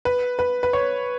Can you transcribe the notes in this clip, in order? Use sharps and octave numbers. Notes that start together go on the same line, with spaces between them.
B4
B4
B4
C#5